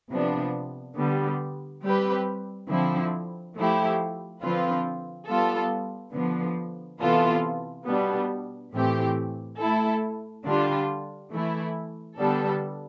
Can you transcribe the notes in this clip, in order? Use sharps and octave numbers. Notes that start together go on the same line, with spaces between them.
C3 F3 B3 D4
D3 G3 B3
G3 C4 G4 B4
D3 F3 C4 E4
F3 A3 E4 G4
D3 F3 C4 F4 B4
G3 B3 F4 A4
D3 F3 B3
C3 E3 B3 F4 A4
B2 G3 B3 D4
A2 E3 A3 C4 G4
A3 E4 A4
D3 G3 D4 F4
E3 A3 E4
D3 G3 B3 D4 A4